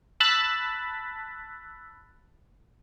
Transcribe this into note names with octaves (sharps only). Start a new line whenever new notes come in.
A5 B5 E6 F#6 A6 B6